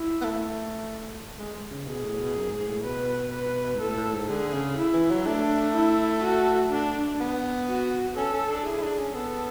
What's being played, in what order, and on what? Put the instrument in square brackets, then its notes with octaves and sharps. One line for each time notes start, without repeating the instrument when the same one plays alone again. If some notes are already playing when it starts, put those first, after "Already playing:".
Already playing: [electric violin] E4
[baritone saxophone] B3
A3
G#3
C#3
[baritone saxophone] B2 [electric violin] G#4
[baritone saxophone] A2
B2
F#2
G#2
A2
[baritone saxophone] B2 [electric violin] B4
[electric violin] B4
[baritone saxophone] G#2
[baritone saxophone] A2 [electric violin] A4
[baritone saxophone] A2
G#2
[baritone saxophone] D3 [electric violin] G#4
[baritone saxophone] C#3
[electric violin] E4
[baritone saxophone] E3
F#3
[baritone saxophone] A3 [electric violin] D4
[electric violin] E4
F#4
D4
[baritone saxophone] B3
[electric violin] F#4
[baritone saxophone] C#4 [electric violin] A4
[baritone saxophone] C#4
D4
[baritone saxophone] E4 [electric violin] G#4
[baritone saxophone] E4
D4
C#4
[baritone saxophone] B3 [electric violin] A4